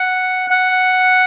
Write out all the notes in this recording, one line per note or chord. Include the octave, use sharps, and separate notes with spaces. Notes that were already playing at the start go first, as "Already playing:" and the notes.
Already playing: F#5
F#5